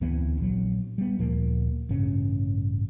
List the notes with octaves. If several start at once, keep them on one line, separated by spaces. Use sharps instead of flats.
D2 E3 B3 C4
A#1 F#3
G3 B3
D2 A#2 F3 A#3
A1 G2 C#3 C#4